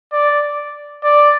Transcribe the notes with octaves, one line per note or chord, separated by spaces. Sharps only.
D5
D5